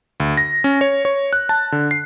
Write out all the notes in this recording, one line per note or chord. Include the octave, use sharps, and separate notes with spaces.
D2
A#6
C#4
C#5
C#5
F#6
A5
D3
C7